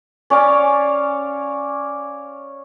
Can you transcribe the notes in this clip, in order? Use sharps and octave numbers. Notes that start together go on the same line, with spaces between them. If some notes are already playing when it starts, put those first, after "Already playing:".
C#4 C#5 D5 F5